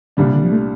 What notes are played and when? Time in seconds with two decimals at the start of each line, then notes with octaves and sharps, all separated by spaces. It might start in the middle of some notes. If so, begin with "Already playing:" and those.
0.17 C2 A#2 D3 G3 D4
0.25 C3
0.34 D3
0.43 F3
0.52 A3